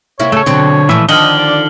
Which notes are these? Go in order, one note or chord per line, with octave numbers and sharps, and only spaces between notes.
C3 A#3 E4 C#5
C#3 A3 A4
B2 D3 F#3 C4
A#2 E3 F3 A3 E5
D3 D#3 F3 D4 D#5 F6 F#7 G7
D5